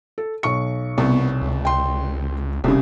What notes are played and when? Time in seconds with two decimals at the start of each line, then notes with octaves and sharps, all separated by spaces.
0.18 A4
0.43 B1 C#6 C#7
0.98 C2 B3
1.41 C#2
1.65 C#2 G5 C6
2.64 E1 C2 C#3 G4 G#4